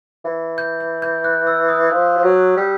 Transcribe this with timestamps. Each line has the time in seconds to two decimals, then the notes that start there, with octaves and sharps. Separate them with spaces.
0.25 E3
0.58 G6
0.81 G6
1.02 G6
1.24 F#6
1.47 E6
1.69 D#6
1.91 F3
2.17 F3
2.24 F#3
2.56 G3